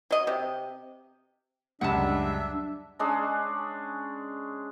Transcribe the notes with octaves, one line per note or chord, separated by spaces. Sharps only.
F#3 D#5
C3
C#2 F#2 G3 D4 E5 F#5 A5
G#3 C#4 D4 G#4